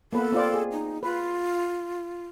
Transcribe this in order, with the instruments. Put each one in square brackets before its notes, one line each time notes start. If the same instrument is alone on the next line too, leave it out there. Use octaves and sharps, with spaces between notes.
[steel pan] A#3 B3 B4 [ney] A4
[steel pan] C4 F4 D5
G#4
[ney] D#4
[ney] F4 [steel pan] B4